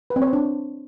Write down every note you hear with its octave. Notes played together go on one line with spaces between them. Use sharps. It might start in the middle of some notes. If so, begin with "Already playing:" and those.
B4
C4
C#5
C5
D4